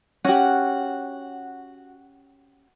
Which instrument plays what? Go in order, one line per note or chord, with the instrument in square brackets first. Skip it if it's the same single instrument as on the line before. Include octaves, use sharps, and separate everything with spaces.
[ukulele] C#4 G4 [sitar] F#4